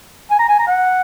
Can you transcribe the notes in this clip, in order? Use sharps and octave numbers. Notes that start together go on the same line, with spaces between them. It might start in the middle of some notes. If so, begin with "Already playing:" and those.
G#5
A#5
G#5
A#5
F#5